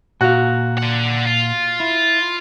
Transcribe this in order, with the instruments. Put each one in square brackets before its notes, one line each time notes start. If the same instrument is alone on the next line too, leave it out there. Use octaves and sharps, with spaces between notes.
[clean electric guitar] A#2 F5 [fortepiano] F#4
[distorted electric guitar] D4 F#5
F4
[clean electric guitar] E4